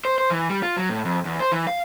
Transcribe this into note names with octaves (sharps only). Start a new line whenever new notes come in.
C5
C5
E3
G3
F4
F#3
A2
F2
E2
C5
E3
F5